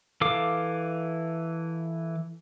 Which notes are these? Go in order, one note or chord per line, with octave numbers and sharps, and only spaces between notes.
E3 A4 F5 D6